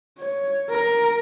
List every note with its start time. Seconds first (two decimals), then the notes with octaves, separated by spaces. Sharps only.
0.18 C#5
0.70 A#4